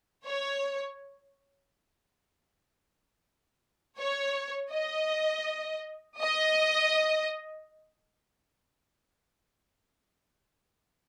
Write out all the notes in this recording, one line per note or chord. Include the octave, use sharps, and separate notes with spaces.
C#5
C#5
D#5
D#5